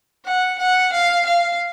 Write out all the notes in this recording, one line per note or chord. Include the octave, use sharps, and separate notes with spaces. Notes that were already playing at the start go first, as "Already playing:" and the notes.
F#5
F#5
F5
F5